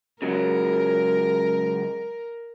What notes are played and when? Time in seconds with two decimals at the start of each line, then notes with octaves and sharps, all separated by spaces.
0.22 C#3 F#3 G#3 A#4